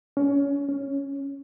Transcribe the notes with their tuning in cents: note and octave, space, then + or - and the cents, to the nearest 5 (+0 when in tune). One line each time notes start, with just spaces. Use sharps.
C#4 +25
C#4 +0